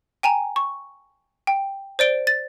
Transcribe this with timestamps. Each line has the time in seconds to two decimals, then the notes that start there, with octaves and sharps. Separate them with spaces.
0.23 G5 G#5 A#5 E7
0.56 C#6
1.47 G5
1.99 C5 D5 D7 G7
2.27 A6